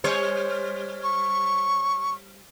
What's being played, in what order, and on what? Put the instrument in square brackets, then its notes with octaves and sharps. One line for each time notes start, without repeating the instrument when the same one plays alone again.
[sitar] G3 C5 C#5
[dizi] C#6